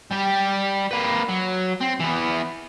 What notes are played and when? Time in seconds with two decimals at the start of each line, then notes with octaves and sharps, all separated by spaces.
0.11 G3 G4
0.91 A#3 B4
1.29 F#3
1.81 C4
2.00 E3 B3